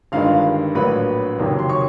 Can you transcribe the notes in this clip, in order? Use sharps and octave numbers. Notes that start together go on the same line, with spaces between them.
G1 G2 D#3 G#3 F4 F5
A#1 A2 F#3 A#3 B4 B5
F#1 F2 C3 D#3 F#3
C6
C#5 C#6